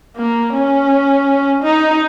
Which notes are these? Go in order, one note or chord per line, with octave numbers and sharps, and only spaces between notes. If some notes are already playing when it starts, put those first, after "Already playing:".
A#3
C#4
D#4